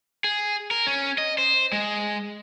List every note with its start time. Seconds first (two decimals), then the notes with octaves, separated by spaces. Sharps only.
0.24 G#4
0.71 A#4
0.87 C#4
1.18 D#5
1.38 C5
1.73 G#3